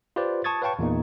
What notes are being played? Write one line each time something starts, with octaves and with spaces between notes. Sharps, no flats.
F4 G4 B4 C5 D5
A5 C#6 D#6 G#6 A6
B4 C#5 F5 G5 A5 C#6
E2 A#2 A#3 D#4